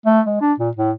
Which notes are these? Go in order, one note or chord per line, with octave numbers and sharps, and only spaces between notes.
A3
G#3
D4
A#2
A2